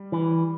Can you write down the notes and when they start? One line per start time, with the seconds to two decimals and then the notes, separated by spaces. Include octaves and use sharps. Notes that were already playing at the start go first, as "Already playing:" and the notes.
Already playing: G3
0.12 E3